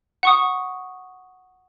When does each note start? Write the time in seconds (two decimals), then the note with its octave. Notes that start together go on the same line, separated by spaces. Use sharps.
0.23 F#5 C#6 D#6